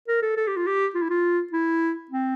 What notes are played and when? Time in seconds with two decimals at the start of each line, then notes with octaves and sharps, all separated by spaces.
0.08 A#4
0.22 A4
0.37 A4
0.48 G4
0.57 F4
0.67 G4
0.95 F4
1.02 E4
1.10 F4
1.53 E4
2.11 C4